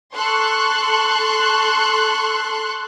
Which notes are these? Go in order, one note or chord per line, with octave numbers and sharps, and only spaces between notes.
A4 C6 C#6 F#6